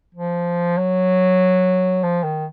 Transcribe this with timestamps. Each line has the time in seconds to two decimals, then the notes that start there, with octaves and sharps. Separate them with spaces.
0.14 F3
0.77 F#3
2.03 F3
2.23 D#3